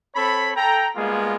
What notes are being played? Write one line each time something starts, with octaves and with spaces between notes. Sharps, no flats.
C4 A4 C#5 B5
A4 G5 A#5
G3 G#3 A#3 B3 F4 G#4